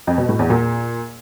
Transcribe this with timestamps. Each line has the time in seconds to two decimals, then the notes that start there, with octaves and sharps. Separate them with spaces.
0.07 F2
0.18 B2
0.29 A2
0.39 E2
0.50 A#2